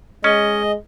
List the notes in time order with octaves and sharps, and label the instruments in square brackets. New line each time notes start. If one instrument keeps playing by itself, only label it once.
[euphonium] G#3 [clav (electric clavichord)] C#4 [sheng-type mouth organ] D#5